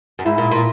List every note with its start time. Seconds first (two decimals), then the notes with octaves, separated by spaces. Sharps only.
0.19 F#2
0.26 G#2 E4
0.38 A#2
0.51 A#2